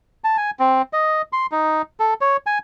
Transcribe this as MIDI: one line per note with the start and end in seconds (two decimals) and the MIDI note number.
0.24 0.37 81
0.37 0.51 80
0.59 0.82 60
0.93 1.22 75
1.33 1.46 84
1.52 1.82 63
2.00 2.14 69
2.21 2.37 73
2.47 2.59 80